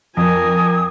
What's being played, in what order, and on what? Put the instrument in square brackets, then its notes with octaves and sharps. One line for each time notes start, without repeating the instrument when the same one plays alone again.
[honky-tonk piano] F2 [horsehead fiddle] A#4 G#5 [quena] D#6